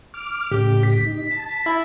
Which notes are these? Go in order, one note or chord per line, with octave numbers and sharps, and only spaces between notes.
D6 F6
A2 C#3 G4
B6
D#4
A5
E4